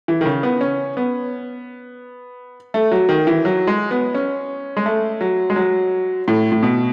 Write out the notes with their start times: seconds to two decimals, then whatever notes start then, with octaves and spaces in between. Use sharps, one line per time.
0.08 E3
0.21 D#3
0.25 C#3
0.43 B3
0.61 C#4
0.97 B3
2.74 A3
2.92 F#3
3.09 D#3
3.27 E3
3.45 F#3
3.67 G#3
3.91 B3
4.14 C#4
4.77 G#3
4.86 A3
5.21 F#3
5.50 G#3
5.56 F#3
6.28 A2
6.52 A2
6.63 B2